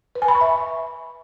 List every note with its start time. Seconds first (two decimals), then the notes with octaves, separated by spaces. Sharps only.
0.15 B4
0.22 G#5
0.28 B5
0.35 C#6
0.41 E5